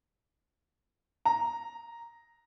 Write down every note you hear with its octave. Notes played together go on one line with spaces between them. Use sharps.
A#5